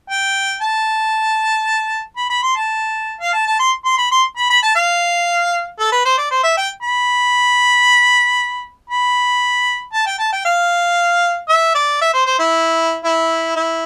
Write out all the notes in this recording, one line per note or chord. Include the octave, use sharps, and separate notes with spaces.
G5
A5
B5
B5
C6
A5
F5
A5
A5
C6
C6
B5
C6
B5
B5
A5
F5
A4
B4
C5
D5
C5
E5
G5
B5
B5
A5
G5
A5
G5
F5
E5
D5
E5
C5
C5
E4
E4
E4